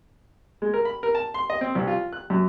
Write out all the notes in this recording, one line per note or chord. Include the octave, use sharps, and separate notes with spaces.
G#3
A#4
B5
A#4
A5
C6
D#5
C4
C2
F4
F#6
F#2